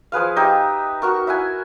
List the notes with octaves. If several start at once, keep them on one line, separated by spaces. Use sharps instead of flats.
F3 G#4 B4 F5
D#4 G4 E5
F#4 A#4 C#6
E4 E5 F#5 G#5